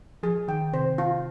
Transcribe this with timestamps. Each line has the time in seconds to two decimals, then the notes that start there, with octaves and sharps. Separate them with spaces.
0.23 F3 G#4
0.48 D#3 G5
0.73 C3 C5
0.98 F4